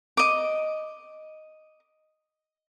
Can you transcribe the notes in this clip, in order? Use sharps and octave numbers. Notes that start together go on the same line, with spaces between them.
D#5 D6